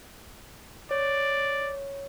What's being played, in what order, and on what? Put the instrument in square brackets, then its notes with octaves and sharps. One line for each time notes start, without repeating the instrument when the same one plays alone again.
[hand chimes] C#5 [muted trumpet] D5